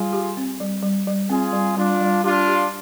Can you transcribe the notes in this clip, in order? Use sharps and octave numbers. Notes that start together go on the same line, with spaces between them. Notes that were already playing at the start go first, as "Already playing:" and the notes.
Already playing: G3 F4 G#4
G4
C4
G3
G3
G3
C4 F4 G#4
G3
G3 D4 F4
G3
D4 F4 G4
G4